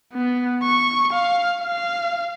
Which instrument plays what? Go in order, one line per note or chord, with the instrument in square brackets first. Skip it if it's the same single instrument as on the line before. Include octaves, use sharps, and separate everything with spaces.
[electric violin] B3
C#6
F5
F5